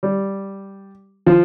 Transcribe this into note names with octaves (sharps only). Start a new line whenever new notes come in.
G3
F3